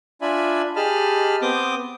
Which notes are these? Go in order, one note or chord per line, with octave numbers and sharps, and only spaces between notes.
D4 F4 D5 E5 G#5 B5
G4 G#4 D#5 A5 B5 F6
B3 C4 D6 D#6 G6